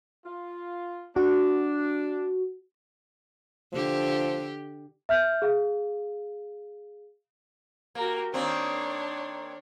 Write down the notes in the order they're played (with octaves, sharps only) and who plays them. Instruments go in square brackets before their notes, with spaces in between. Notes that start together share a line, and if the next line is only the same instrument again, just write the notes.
[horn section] F4
[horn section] D4 [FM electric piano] F#4
[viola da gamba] D3 G4 [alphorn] F3
[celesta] E5 F6 G6
G#4 F5
[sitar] A#3 [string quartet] F#4 G4 A#4
[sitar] D#3 A#3 C4 [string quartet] D4 C#5